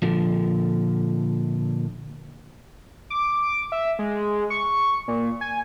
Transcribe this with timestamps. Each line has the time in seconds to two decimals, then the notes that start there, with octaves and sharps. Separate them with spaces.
0.02 A#2 D3 F3
3.10 D6
3.72 E5
3.99 G#3
4.50 C#6
5.08 A#2
5.41 G#5